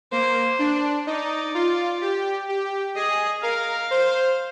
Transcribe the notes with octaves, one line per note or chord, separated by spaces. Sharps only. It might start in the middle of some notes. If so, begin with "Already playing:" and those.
A#3 C5
D4
D#4 D5
F4
G4
G4
G#4 D#5
A#4 F5
C5